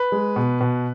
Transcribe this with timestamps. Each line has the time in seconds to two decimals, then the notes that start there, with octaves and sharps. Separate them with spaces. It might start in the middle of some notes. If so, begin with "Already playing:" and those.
Already playing: B4
0.12 G#3
0.36 B2
0.61 B2